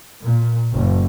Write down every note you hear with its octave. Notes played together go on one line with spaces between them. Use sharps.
A#2
F#1